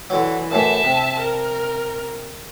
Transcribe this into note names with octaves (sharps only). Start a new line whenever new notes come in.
D3 E3 F#3
F#2 A2 E3 E5 A5
C3
A#4